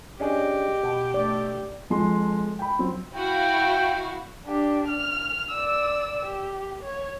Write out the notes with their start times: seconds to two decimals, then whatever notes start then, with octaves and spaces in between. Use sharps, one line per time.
0.20 C#4 D4 G4 G#4 D#5
0.83 B2
1.14 A3 D5
1.90 F2 F3 G#3 C6
2.59 G5 B5
2.79 F#3 C4
3.15 E4 F#4 F5 G5
4.46 D4 G4
4.88 F6
5.51 D5 E6
6.25 G4
6.83 C#5